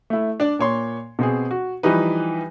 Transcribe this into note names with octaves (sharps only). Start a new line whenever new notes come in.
A3 E4
D4 D5
A#2 C#5 C6
B2 C4 G#4
F#4
E3 F3 G3 D#4 B4